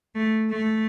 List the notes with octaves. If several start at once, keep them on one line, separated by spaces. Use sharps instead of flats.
A3
A3